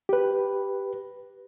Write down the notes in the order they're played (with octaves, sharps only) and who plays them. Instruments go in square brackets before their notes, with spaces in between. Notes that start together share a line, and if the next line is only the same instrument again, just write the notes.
[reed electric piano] G4 B4